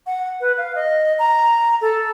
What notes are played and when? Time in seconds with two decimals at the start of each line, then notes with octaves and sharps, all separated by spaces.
0.07 F#5
0.41 B4
0.58 F5
0.75 D#5
1.19 A#5
1.81 A4